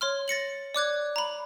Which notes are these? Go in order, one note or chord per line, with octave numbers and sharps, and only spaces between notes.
C#5 C6 F6
A6 A#6 C#7 F#7
D5 D6 F#6 G#6
A#5 B5